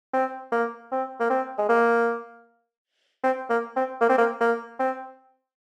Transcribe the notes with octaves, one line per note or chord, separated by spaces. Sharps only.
C4
A#3
C4
A#3
C4
G#3
A#3
C4
A#3
C4
A#3
C4
A#3
A#3
C4